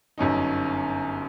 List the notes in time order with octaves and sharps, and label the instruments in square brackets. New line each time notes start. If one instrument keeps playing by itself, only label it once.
[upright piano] G1 F#2 C#4 D#4